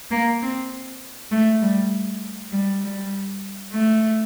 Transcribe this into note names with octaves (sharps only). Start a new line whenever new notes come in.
A#3
C4
A3
G3
G3
G3
A3